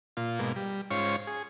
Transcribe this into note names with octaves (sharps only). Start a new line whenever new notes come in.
A#2 F4
G#2 B2 A#3
G3
G#2 C#4 F4 C5 C#5 C#6
G#4